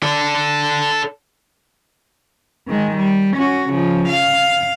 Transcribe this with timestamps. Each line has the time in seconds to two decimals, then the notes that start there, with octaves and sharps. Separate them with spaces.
0.03 A4 D5
2.67 D#3 G#3
2.96 G3
3.37 C#4 F#4
3.69 C#3 F3
4.08 F5